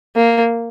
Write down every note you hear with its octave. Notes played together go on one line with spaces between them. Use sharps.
A#3